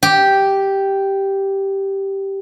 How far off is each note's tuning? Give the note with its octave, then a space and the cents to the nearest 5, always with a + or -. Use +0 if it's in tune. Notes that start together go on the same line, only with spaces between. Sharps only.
G4 -5